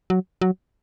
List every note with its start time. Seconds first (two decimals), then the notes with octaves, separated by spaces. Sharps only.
0.10 F#3
0.41 F#3